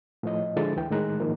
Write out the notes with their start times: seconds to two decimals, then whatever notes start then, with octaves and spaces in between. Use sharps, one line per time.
0.23 A2 F3 D#5
0.57 D3 F3 G#3 E4 A4 A6
0.76 D2 E3 G5
0.91 A2 D#3 G#3 A#5 F#6
1.20 G#2 D#3 F3 A#3